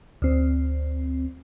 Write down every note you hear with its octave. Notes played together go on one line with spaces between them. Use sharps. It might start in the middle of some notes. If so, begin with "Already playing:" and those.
D2 C4